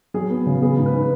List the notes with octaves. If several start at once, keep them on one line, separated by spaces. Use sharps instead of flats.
F#3 G#4
B3
C#3
B3 G#4
G#2
B4